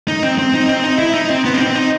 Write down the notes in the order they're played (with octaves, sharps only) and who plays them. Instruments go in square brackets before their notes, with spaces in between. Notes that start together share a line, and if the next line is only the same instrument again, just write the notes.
[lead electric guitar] D#4
C4
C4
D#4
C4
D#4
E4
D#4
C4
B3
D#4
C4
D#4